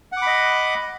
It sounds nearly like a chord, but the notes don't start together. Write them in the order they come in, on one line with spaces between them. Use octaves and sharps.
F#5 D6 B5 D#5